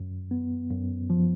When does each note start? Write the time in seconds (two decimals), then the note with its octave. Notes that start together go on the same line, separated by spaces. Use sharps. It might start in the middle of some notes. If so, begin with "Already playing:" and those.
Already playing: F#2
0.31 B3
0.70 F#2
1.10 F3